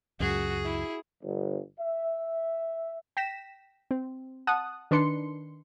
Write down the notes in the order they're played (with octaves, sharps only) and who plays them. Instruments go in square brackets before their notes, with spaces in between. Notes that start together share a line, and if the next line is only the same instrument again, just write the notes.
[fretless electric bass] C#2 F#2 [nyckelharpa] F#4 [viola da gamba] G#4
[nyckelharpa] E4
[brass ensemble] G1
E5
[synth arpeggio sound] G5 A#6 B6 E7
C4
F#5 A5 D#6 F#6
D#3 D4 B4 C6 C#7